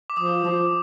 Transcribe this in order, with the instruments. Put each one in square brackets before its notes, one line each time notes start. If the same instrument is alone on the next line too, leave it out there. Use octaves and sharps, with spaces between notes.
[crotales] D6
[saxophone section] F3 [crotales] D#6
[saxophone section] F3